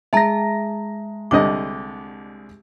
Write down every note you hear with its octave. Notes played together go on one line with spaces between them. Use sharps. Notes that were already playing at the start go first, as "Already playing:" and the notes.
G#3 E5 A5 A#5 A#6
C2 D3 D#5 D6